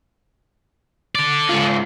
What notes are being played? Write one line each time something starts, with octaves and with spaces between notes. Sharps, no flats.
A4 D5
G#2 F4